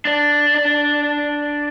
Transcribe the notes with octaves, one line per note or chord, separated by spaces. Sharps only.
D4 D5